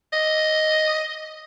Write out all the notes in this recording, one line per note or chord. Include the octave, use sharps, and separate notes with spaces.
D#5